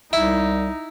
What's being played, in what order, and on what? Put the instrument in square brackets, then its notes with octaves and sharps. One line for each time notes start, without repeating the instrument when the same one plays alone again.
[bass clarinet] C2 [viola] D#4 [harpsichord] E4